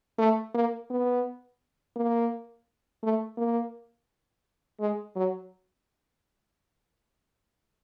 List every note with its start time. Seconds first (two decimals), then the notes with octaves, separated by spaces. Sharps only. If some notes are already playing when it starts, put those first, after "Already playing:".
0.18 A3
0.54 A#3
0.90 B3
1.96 A#3
3.03 A3
3.37 A#3
4.80 G#3
5.16 F#3